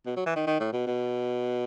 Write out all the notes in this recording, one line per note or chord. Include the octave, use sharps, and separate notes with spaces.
B2
F#3
E3
D#3
D#3
A2
B2
B2